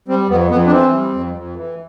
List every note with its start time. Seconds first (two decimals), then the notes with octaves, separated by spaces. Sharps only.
0.08 G3 C4
0.29 F2 B3
0.51 F2 B3
0.67 D4
0.71 E3 C4
0.93 G3
1.14 F2
1.35 F2
1.56 E3